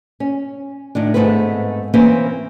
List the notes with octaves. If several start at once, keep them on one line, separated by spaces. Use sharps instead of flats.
C#4
A2 D#3 D4
G#2 B2 A3 B3 C4 B4
E3 A#3 C4 C#4 B4 C5